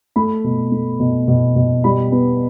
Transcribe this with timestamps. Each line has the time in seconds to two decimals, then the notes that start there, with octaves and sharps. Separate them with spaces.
0.16 A3 B5
0.44 B2
0.72 A3
1.00 B2
1.28 B2
1.56 B2
1.84 G3 B5
2.12 B3